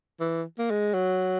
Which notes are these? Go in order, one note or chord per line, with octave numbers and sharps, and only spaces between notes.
E3
A#3
G#3
F#3